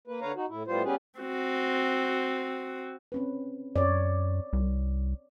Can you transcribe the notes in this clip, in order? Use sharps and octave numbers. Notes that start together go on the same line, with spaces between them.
A#3 B4
D3 B4 C#5 F5 A#5
D#4 F#4
A2 E4
A2 G3 B3 F4 C5
G3 B3 C#4 G4 G#4 B4
C4 F#4
C4 C#4 B4
F#2 C#5 D5
C2